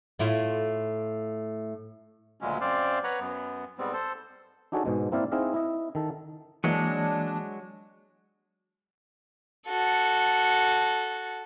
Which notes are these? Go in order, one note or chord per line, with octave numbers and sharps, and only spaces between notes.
A2 E4 F4
D2 A#2 C#3 F#3 G#3 C#4
F#2 C4 C5 D5 F5
B4 C#5 F#5 A#5
F#2 B3
G#2 G3 B3 C4
A4 C5
D4 D#4 F#4 G#4 A4 C#5
G#2 B2 G#3
A#3 C4 E4 D5 F5
C4 D#4 E4 G#4 D#5 F5
E4 D#5
D#3 A4
E3 F#3 G#3 A#3 D4
F#4 A4